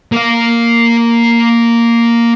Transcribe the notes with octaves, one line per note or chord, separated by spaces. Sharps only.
A#3 F5